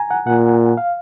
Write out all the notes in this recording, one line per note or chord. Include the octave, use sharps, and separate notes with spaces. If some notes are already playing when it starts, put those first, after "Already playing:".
Already playing: G#5 A#5
F#5
A#2 F#5
F5